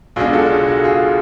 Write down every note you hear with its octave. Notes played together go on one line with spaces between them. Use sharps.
B1 B2 G#3 D4 F4 G#4
F#4 A4
F#4
F4 G#4